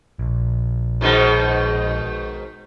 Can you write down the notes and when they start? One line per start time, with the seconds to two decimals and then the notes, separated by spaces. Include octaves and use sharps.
0.19 A#1
1.01 G#2 B2 D#3